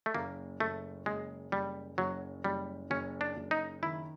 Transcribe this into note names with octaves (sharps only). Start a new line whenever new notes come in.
A3
F#1 A#3
F#1 A3
F#1 G#3
F#1 G3
F#1 F#3
F#1 G3
F#1 C#4
D4
F#1
D#4
D#3 E4